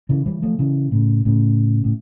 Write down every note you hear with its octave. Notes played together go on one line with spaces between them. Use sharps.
C#3 E3
E3 G3
F3 A3
C#3 E3
A2 C#3
A2 C#3
A2